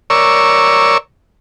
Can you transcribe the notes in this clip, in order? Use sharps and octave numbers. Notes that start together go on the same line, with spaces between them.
A#4 C#5 D5 C#6 E6